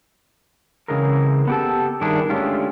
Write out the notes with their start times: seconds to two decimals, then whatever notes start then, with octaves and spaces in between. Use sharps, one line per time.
0.88 C#3 E3 G#3 C4 A#4
1.47 B3 G4 A4
2.01 G2 D#3 D4 E4 G#4
2.30 D3 G#3 A3 C#4 F4 G4